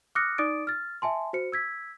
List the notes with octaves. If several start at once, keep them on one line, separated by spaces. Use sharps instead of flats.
D6 D#6 F6 F#6 A#6 C#7
D#4 D5 D6 D#6 A6 D7
F6 A6
E5 G#5 A5 C6
F#4 C5 C#7
E6 G#6 B6